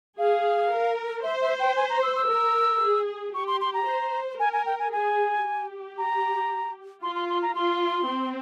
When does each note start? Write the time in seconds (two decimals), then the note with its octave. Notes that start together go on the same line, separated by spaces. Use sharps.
0.18 G#4 F5
0.72 A#4
1.23 C5 E5
1.41 E5
1.59 G5
1.77 G#5
1.90 A#5
2.03 E6
2.16 E6
2.28 A#4
2.82 G#4
3.34 G4 C#6
3.47 C6
3.61 C6
3.74 A#5
3.87 C5
4.39 A#4 G#5
4.53 G#5
4.66 G5
4.79 G#5
4.92 G#4 G#5
5.45 G4
5.98 A#5
7.03 F4 C6
7.15 C6
7.29 C6
7.43 A#5
7.55 F4 C6
8.08 C4